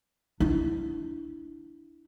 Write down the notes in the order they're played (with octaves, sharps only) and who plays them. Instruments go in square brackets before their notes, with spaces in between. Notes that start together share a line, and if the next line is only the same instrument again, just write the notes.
[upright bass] D4 E4